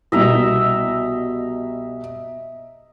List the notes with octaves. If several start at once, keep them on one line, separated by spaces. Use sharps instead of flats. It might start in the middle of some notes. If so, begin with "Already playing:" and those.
C2 B2 D#5 E5 A#5